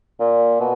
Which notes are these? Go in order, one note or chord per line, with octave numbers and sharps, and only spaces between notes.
A#2
B2